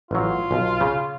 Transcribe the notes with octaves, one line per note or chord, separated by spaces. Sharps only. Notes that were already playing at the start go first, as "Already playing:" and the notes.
A1 F#3 F4
B1
C#3